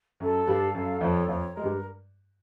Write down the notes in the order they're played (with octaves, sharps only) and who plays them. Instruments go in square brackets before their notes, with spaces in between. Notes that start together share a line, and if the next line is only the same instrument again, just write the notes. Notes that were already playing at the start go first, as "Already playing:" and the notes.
[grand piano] F#2 F#3 [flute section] A4
[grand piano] G2 G3 [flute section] F5
[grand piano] F#2 F#3 [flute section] A4
[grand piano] F2 F3 [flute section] C#5
[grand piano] F2 F3 [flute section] C#5
[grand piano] G#3 [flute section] A#4
[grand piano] G2 G3